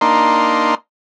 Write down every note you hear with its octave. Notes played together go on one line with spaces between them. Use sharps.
A#3 D4 D#4 C6